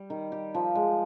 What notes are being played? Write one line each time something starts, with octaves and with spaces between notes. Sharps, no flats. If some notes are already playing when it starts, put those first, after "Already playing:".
Already playing: G3
D#3
G4
F3
G#3